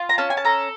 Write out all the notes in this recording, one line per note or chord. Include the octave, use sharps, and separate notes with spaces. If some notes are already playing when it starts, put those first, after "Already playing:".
Already playing: F4
A#5
C#4 A5
G#5
A5
A4 A#5